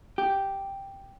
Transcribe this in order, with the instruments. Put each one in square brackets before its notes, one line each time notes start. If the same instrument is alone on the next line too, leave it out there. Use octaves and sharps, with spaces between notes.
[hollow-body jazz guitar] G4